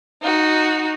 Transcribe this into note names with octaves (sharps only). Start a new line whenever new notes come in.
D#4 F#4